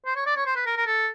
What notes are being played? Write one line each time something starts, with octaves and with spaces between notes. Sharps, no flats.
C5
C#5
D5
C#5
C5
B4
A#4
A#4
A4